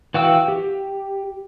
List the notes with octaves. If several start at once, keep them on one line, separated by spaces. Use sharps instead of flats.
E3 F#4 F5 G5 E6
G4